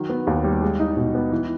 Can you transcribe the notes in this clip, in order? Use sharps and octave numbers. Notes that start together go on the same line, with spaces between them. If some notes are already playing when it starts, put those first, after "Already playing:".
Already playing: D#3 F#3
B3
D#2
G3
G#3
D#4
B2
B3
E3